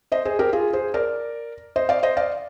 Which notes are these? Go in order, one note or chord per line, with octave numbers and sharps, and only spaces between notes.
C5 D#5
G#4 C5
G4 A#4
F4 G#4
G#4 C5
A#4 D5
C5 D#5
D5 F5
C5 D#5
D5 F5